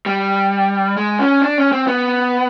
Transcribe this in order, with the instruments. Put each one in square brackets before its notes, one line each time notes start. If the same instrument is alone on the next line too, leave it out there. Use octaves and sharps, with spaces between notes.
[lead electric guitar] G3
G#3
C#4
D4
C#4
C4
B3